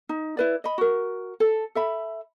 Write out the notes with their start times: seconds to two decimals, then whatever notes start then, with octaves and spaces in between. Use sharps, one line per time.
0.09 D#4
0.37 E4 B4 D5
0.64 D#5 B5
0.78 F#4 A#4
1.40 A4
1.75 A4 E5 B5